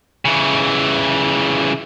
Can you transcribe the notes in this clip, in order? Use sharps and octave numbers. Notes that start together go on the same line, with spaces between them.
C#3 E3